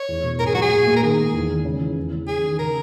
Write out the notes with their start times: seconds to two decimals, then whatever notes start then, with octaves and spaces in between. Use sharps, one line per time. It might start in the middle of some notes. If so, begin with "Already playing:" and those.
Already playing: C#5
0.09 E2
0.24 B2
0.39 G#2 A#4
0.46 G#4
0.54 F#3 F#4
0.62 G#4
0.71 A#2
0.87 A#3
0.96 A#4
1.02 D#3 G#4
1.19 G#3
1.34 E2
1.50 D#3
1.65 C#3
1.81 E3
1.97 E2
2.12 C#3
2.27 F#2 G#4
2.44 D#3
2.59 C#3 A#4